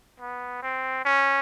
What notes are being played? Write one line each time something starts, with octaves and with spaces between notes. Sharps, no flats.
B3
C4
C#4